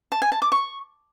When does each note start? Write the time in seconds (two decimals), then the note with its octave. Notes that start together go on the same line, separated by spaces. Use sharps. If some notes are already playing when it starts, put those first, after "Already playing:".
0.12 A5
0.22 G#5
0.32 A5
0.42 D6
0.52 C#6